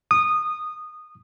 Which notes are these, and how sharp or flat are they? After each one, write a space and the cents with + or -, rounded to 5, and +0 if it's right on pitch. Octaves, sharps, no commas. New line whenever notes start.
D#6 -15